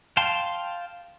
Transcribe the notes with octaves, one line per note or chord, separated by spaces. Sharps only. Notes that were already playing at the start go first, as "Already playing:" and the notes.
F5 G5 A5 C6